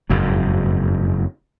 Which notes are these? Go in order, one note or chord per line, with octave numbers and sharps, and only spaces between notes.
F#1 F2 G#2